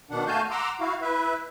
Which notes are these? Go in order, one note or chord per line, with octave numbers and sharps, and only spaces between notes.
B2 D#3 D4 F#5
A3 F#4 F5 G#5 A5 G6
F#5 A#5 C6 D6 E6
E4 F#4 F5
E4 B4 E5